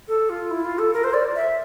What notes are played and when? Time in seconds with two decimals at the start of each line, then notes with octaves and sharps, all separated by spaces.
0.08 A4
0.30 F4
0.51 E4
0.65 F4
0.79 A4
0.93 A#4
1.04 C5
1.14 D5
1.36 E5